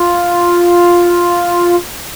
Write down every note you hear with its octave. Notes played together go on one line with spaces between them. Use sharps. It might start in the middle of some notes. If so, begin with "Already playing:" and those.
Already playing: F4